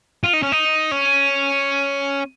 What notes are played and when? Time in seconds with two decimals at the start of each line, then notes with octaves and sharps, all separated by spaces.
0.24 F4
0.33 D#4
0.43 C#4
0.52 D#4
0.91 C#4